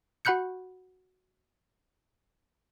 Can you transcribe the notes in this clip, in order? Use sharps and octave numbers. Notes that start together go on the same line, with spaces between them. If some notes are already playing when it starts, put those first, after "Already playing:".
F#4 F#5 B5 F#6 G6 C#7